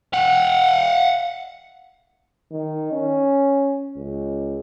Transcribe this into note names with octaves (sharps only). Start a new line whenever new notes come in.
F5 F#5
D#3
C#4
C#2